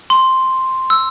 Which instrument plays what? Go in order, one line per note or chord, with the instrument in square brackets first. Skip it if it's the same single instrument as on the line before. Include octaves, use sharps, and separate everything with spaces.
[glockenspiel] C6
E6